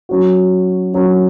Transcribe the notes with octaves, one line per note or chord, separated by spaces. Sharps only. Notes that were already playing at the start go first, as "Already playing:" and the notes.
F#3 C#4 F#4
F#3 C#4 F#4